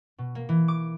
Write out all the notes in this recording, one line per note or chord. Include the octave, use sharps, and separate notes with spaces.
B2
A#3
E3
D6